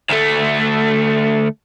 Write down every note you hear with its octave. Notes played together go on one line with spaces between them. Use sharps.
D2 A3